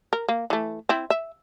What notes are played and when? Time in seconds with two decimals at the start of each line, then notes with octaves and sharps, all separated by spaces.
0.13 A#4
0.28 A#3
0.50 E3 A3
0.89 C4 E4
1.10 E5